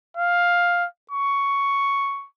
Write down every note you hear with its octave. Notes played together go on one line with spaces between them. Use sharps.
F5
C#6